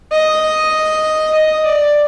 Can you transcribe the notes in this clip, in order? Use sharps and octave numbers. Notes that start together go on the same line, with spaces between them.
D#5
D#5
D5